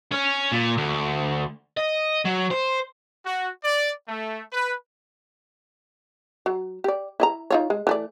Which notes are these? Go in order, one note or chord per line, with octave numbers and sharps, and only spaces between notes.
C#4
A#2
D2
D#5
F#3
C5
F#4
D5
A3
B4
F#3
G4 D5
E4 D#5 A#5
D#4 F4 C#5
G#3
E3 A3 D5